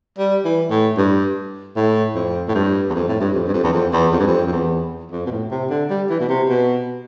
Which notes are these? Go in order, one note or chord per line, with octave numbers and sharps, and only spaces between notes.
G3
E3
A2
G2
A2
F2
A2
G2
E2
F2
A2
G2
F2
G2
F2
E2
F2
E2
F2
G2
F2
F2
E2
F2
B2
A2
C3
D3
G3
E3
B2
C3
B2